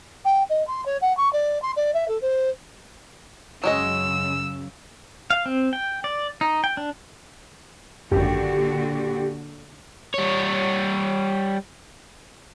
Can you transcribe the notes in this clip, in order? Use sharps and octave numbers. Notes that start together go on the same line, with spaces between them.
G5
D#5
C6
C#5
F#5
C#6
D5
C6
D5
E5
A4
C5
F#2 C#3 F#3 G#3 D#5 E6
F5
C4
G5
D5
D#4
G5
D4
G#1 F#2 A#2 D3 F#4 G4
G3 C#5